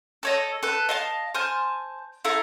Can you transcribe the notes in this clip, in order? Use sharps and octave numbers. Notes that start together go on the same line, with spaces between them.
A4 C#5 D#5
A4 B4
D#5 F5 A5
C5 G#5 A5 F6
E4 A4 F5 A#5